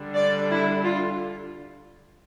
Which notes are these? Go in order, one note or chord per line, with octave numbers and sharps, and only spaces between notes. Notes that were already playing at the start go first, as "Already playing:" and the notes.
Already playing: D3 G3 D4
D5
E4
F4